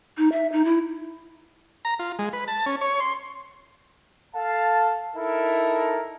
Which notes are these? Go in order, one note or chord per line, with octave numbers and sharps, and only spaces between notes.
D#4
E5
D#4
E4
A#5
F4
G#3
B4
A5
C#4
C#5
C6
A4 F5 A5
D#4 E4 A4 A#4